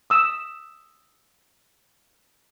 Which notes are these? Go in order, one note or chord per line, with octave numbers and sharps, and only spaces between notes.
D#6 E6